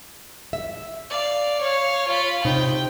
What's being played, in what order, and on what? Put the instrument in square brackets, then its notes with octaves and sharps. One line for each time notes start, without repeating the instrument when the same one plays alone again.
[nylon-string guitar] E5
[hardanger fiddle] D5 F5
C#5 F5
F4 B5
[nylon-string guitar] C3 D#4 [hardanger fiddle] G5